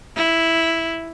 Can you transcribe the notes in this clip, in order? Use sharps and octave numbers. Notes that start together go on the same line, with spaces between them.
E4